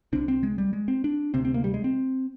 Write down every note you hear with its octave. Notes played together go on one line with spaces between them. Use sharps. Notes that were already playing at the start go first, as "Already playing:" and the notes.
C2 C3 D4
C4
G#3
G3
G#3
C4
D4
D2 C3 C4
C4
A#3
G3
G#3
C4